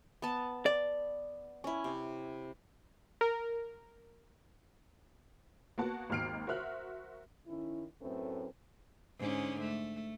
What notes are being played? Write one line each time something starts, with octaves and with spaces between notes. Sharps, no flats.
B3 A5
D5
C#4 E4
C3
A#4
A#3 B3 F#4 A5
G#1 D#2 D#3 F6 C7 D7
F#4 A#4 C5 E5 F6 F#6
D#3 C#4 E4
F#2 A2 A3 C4 B4
G#2 D3 C#4
A3